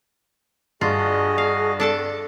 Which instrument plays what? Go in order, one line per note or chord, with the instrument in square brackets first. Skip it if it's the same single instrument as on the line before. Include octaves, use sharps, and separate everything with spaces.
[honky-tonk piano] G2 [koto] F4 [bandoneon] F#4 D#5 [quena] G#4
[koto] F5
D4 A4 A5